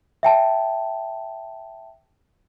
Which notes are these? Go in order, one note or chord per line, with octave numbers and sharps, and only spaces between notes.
E5 G5 A5